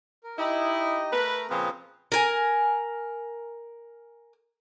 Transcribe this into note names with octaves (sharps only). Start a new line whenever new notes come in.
A#4
D#4 E4 G4 D#5
A3 A#4 B4 A#5
A#2 C#3 F3 C4 G#4 B4
A#4 G#5